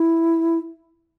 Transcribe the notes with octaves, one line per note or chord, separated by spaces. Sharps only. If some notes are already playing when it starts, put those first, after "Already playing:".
Already playing: E4